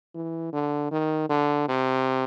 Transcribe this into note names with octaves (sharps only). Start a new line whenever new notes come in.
E3
D3
D#3
D3
C3